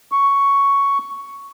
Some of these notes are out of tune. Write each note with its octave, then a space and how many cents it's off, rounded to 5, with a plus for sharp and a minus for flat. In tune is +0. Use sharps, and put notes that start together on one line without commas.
C#6 +5